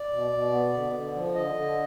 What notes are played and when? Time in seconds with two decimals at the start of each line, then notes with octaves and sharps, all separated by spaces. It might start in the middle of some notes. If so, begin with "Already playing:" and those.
Already playing: D5
0.11 B2
0.32 B2
0.52 B3
0.73 D3
0.94 D3
1.14 F3
1.34 D3 D#5
1.55 D3